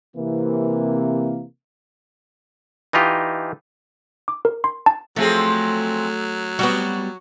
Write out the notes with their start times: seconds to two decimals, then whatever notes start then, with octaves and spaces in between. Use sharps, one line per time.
0.17 C3 E3 A#3
2.93 E3 D#4 F4 G4 D#5
4.28 D6
4.45 A#4
4.64 C6
4.86 A5
5.16 F3 F#3 A3 C4 G#4
6.59 G3 B3 F#4